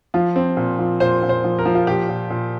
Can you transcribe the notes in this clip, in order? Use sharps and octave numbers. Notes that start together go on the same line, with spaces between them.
F3 F4
C4
A#2
F3
A#2 C5
A#2
C5
F3
A#4
F3
F4
A#2 G4
A#2
A#2